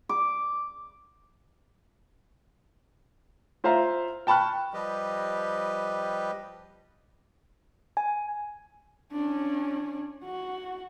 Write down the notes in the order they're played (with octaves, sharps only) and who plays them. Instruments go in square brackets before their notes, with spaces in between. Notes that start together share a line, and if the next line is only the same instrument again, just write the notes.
[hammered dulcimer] D6
[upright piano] F4 C5 E5 F5 A#5
G5 A5 B5 C#6 F6 F#6
[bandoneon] F3 G3 G4 B4 D#5
[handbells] G#5
[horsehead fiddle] C#4 D4
F#4